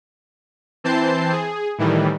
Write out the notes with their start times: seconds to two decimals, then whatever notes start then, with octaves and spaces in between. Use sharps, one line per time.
0.84 E3 C4 C5 A5 G6 C7
1.32 G#4
1.78 A2 D#3 E3 G3